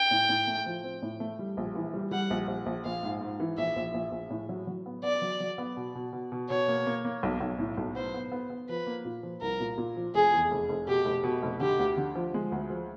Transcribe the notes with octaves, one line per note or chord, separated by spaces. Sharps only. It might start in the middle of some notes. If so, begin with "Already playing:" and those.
Already playing: G5
A2
A2
A3
F3
C4
A2
A3
G3
A#1
E3
G3
G3 F#5
A#1
A#1
A#1
A#1 F5
G#2
G#2
E3
A#1 E5
A#1
A#1
A#1
A2
F#3
F#3
B3
B3 D5
F#3
F#3
B3
B2
B2
B2
B2
B2 C#5
A#3
A#3
A#3
B1
B1
A2
B1
B3 C5
B3
B3
B3
F3 B4
A#3
A#2
F3
C2 A#4
A#2
A#2
F3
F1 G#4
E2
F1
F1
B2 G4
F1
B2
F1
D3 G4
D2
D3
F3
G#3
D2
F3